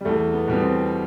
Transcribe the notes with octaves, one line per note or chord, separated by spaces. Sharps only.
G3
E2 A3
B3
B2 G3 B3
C4